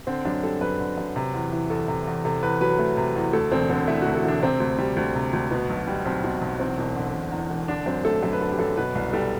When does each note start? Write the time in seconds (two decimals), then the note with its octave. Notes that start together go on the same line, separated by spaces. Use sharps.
0.07 D3 C4
0.25 F#2 D4
0.43 G3 A4
0.61 F#2 B4
0.80 D3
0.98 F#2
1.16 C3
1.34 E2
1.52 E3
1.70 E2 A4
1.88 C3
2.07 E2
2.25 C3 A4
2.43 E2 B4
2.61 F#3 B4
2.79 A3
2.97 C3
3.16 E2
3.33 D2 A4
3.51 E1 C4
3.69 D3 C4
3.87 A3 E4
4.01 D2 F#4
4.15 A4
4.24 E1 D4
4.42 C3 C4
4.60 D2
4.78 G3
4.96 D2
5.15 C3
5.33 D2
5.51 B2 B3
5.69 B1
5.87 G3
6.05 B1 C4
6.24 B2
6.41 B1
6.60 E2 C4
6.78 E1
6.96 D3
7.14 E1
7.32 E2
7.50 E1
7.68 D3 D4
7.86 F#2 C4
8.05 A3 A4
8.22 F#2 A4
8.33 B4
8.41 D3 A4
8.52 G4
8.59 F#2 A4
8.77 B2 B4
8.95 C2
9.13 G3 A4